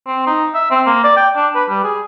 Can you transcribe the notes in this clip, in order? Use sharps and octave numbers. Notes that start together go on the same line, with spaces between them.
C4
D#4
E5
C4
A#3
D5
G5
D4
B4
G3
G#4